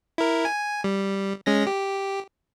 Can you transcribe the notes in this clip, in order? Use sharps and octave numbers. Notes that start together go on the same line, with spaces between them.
E4 A#4
G#5
G3
G#3 C#4 A#6
G4